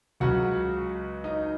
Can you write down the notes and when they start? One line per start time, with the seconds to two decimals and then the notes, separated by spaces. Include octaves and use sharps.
0.20 C#2 C#3 F#3 F#4 F#5
1.24 D#4 D#5